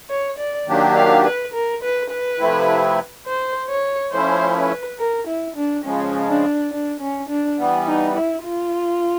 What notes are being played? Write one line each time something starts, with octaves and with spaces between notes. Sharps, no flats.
C#5
D5
D#3 F#3 A#3 D4 G4
F5
B4
A#4
B4
B4
C3 F3 A3 C4 E4
C5
C#5
F3 A3 C#4 E4 C5
B4
A#4
E4
D4
C#3 F3 G#3 C#4
D4
D4
C#4
D4
E3 G3 B3
D#4
E4
F4